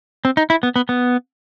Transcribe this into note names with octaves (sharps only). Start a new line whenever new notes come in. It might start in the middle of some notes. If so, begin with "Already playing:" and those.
C4
D#4
E4
B3
B3
B3